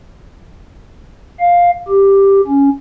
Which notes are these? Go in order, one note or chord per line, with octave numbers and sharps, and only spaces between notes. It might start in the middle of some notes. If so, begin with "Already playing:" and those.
F5
G4
C#4